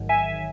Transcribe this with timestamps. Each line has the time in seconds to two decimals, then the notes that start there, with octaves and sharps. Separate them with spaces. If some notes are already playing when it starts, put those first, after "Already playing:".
Already playing: A1 G#2 D#3 F#3
0.09 E5 G#5